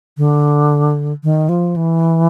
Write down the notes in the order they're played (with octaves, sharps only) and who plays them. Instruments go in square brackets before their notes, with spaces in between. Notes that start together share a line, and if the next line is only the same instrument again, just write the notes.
[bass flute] D3
D#3
F3
E3